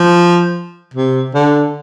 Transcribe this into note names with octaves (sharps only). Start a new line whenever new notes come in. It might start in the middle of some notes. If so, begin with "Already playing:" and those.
Already playing: F3
C3
D3